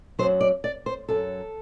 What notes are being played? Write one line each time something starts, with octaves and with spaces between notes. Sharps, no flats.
F#2 F#3 C5
D5
D5
C5
F#2 F#3 A4